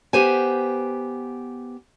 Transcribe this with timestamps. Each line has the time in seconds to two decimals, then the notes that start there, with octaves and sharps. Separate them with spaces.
0.13 B3 G4 C5 G#5